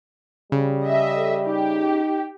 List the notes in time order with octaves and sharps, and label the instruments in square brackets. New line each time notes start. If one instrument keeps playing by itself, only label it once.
[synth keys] C#3 [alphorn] G3
[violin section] D#5 E5
[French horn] A4
[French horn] D#4 [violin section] G4